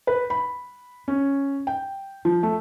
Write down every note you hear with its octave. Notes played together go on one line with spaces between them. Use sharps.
B4
B5
C#4
G5
F3
A3